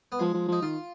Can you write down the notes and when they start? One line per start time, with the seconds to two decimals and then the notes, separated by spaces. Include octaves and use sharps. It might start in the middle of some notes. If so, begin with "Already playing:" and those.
0.12 B3
0.19 F3 G#3
0.34 F3
0.48 F3 D#4
0.62 D#3 F4